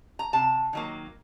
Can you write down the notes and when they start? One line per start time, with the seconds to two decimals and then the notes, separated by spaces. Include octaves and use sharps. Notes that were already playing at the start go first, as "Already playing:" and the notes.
0.19 A#5
0.33 C3 A5
0.73 D#3 F#3 A#3